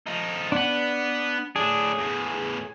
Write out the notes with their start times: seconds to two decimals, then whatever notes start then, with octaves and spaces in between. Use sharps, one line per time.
0.07 F3 D#4
0.52 B3 D4 B4 F#5
1.56 A2 D4 G#4
1.98 E2 A2